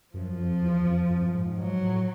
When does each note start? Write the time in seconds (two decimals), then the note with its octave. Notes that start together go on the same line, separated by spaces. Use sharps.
0.14 F#2 F3
0.38 F2
0.62 E2
0.86 F2
1.10 F2
1.22 F#2
1.34 G#2
1.46 G#2
1.57 G#2 F#3
1.82 A2